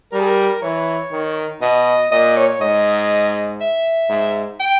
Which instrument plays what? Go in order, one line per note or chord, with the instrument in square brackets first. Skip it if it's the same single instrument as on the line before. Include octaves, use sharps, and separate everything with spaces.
[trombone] G3 [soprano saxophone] A#4
[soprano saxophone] G#4
A#4
[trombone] E3 [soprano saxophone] C#5
[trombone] D#3
[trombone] B2 [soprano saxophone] D#5
[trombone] A#2 [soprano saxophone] D#5
[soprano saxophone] C#5
[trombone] G#2 [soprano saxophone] D#5
[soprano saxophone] E5
[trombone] G#2
[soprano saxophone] G5